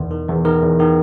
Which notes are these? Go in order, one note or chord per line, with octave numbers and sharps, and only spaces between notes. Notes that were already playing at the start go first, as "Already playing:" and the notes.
Already playing: E2 D#3
D#3
E2
D#3 A#4
E2
D#3